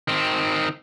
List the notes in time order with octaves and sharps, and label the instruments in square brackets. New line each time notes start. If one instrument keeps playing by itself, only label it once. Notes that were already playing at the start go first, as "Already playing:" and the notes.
[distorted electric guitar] D#3 C4